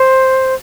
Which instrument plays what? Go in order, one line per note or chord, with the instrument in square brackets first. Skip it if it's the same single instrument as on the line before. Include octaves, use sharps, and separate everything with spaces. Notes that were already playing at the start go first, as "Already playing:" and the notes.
Already playing: [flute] C5